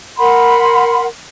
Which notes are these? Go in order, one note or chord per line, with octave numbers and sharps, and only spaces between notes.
A#4 F#5 B5 C6